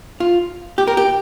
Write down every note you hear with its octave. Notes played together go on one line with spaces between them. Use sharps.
F4
G4
A#4
G4